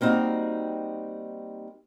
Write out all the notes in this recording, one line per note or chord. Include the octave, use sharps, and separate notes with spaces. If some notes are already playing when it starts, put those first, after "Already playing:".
G3 A#3 C4 D#4 F#4